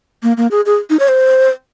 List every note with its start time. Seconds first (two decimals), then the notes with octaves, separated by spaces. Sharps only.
0.23 A#3
0.37 A#3
0.51 G#4
0.66 G#4
0.90 D#4
0.99 C#5
1.08 C5